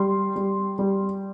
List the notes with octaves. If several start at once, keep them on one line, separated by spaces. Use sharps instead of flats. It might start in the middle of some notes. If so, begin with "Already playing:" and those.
Already playing: G3 C6
G3
G3